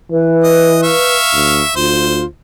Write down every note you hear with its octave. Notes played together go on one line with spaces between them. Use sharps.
E3 B4
D#5
E5 F5 C#6
D2
D2 F4 C5